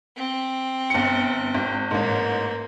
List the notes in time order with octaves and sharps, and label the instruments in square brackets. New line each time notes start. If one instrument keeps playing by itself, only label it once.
[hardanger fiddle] C4
[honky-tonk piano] G1 C#7
G#1
[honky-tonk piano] A1 G#2 [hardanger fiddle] A#3